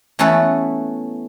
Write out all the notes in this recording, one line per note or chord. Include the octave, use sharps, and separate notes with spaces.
E3 A3 B3 C#4 A4 B4